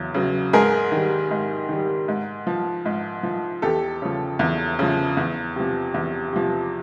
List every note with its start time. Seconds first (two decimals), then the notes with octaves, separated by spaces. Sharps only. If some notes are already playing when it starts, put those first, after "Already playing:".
Already playing: E2 C#3 F#3
0.14 C#3 F#3
0.53 G#2 G#4 A#4
0.92 D#3 G3
1.31 G#2
1.69 D#3 G3
2.08 G#2
2.47 F3
2.86 G#2
3.23 F3
3.62 E2 G4 A4
4.02 C#3 F3
4.39 E2
4.79 C#3 F3
5.17 E2
5.56 C3 F3
5.94 E2
6.33 C3 F3